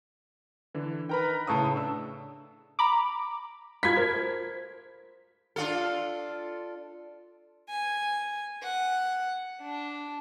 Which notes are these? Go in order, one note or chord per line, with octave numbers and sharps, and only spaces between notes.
D3 E3
D#3 A#4 B4 G5 A#5 B5
A2 C#3 G5 A5 C#6 D#6 E6
D4 E6
A#5 B5 D6
F4 A4 B5 G#6 B6
A#4 C5
D4 F4 A4
G#5
F#5
D4